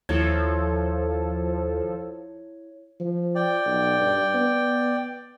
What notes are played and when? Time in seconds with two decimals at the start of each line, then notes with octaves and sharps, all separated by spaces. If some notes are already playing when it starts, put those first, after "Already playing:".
0.09 D#2 F3 E4 A4 C#5 G#6
3.00 F3
3.35 D5 G5
3.66 B1
4.00 G2
4.34 B3